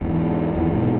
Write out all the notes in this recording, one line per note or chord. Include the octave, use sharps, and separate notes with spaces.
E2 G#2
E2 G#2
G#2 B2